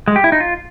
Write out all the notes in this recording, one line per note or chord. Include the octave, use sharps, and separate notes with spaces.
G#3
G4
E4
D#4
F4